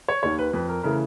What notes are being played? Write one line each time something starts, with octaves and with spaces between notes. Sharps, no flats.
C#5
D#2 D#3 C#5
B4
F2 B4
A#4
C#3 E3 A3 A#4